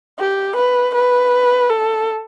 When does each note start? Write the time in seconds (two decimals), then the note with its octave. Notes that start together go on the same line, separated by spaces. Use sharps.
0.19 G4
0.56 B4
0.95 B4
1.69 A4